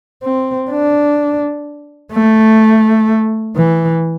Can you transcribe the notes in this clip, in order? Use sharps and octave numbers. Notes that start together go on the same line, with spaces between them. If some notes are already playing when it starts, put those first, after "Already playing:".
C4
D4
A3
E3